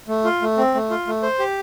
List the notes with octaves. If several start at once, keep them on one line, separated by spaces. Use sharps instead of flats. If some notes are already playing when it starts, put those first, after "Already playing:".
A3
F4
A3
C4
A3
F4
A3
C5
G4